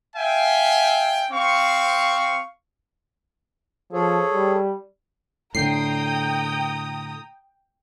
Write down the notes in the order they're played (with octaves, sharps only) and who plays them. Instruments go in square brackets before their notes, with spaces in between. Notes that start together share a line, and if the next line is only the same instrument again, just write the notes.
[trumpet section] E5 F5 G5 G#5
C4 F5 C#6
[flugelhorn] F3 [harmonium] G#4 A4 C#5
[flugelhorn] G3
[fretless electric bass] A2 D3 [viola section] G5 [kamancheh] A#5 D#6 [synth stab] C7